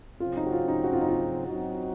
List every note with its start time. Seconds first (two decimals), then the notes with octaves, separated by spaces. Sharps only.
0.20 C#3 F#3 C4 F4
0.37 D#4
0.47 F#4
0.52 F4
0.68 D#4
0.84 F#4
0.93 F4
1.01 D#4
1.08 F4
1.48 F#3 C4 D#4 F#4